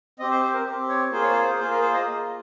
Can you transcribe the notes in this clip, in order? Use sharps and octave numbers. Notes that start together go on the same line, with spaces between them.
C4 G4 D#5
C5
C5
A#4
C4 G4
C#5
A#3 F4 G#4 C5
C#5
C5
A#3 F4 G#4 C5
A#4
C5
D#5